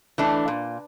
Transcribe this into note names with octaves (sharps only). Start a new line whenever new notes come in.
E3 A3 D4
A#2